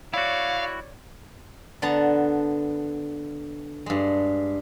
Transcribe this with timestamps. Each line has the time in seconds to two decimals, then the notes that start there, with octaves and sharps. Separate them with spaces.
0.14 E4 F#4 C#5 D5 F5
1.82 D3 B3 A5 A#5
3.86 G2 G#3